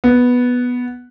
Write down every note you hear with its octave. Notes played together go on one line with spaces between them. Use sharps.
B3